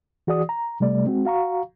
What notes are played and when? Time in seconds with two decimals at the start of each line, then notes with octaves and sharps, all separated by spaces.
0.27 E3 F#4 G#4 D5 D#6
0.49 A#5
0.80 C3 G3 A3 D5
1.05 G#3 C4 F#4
1.25 F#4 F5 A#5 C#6